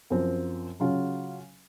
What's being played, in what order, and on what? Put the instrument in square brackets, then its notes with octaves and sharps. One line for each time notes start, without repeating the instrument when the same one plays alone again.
[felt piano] F#2 F3 C4
C#3 F#3 C#4 F4